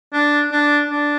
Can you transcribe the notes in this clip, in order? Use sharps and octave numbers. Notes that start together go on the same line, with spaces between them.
D4
D4
D4